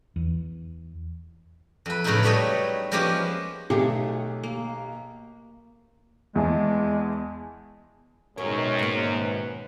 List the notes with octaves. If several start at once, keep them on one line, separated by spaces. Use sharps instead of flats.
E2
F2 B4
A2 C#3 F#3 A3 D#4 E4
F#3 G3 A3 B3 C#5 D#5
F3 G#3 A#3 B3 C#4 G4
B1 F#3 A3 G4 G#4
A#3
E2 G#3 A5
F#2 B2 D#3 G#3 A#4 C#5
G#2 A#3
B4